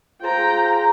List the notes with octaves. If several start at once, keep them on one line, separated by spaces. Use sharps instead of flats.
F4 G#4 C5 G5 A#5